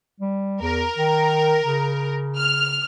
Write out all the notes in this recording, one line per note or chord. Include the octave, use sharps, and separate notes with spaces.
G3
E2 A#4
D#3
C#3
F6